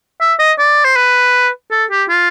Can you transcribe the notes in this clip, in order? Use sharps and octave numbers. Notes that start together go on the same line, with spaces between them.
E5
D#5
D5
C5
B4
A4
G4
F4